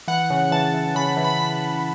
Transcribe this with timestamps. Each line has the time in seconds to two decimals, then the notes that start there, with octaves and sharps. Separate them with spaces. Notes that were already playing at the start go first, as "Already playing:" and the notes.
0.08 E3 F#5
0.30 C#3
0.51 E3 A5
0.74 E3
0.95 C#3 B5
1.17 E3
1.25 B5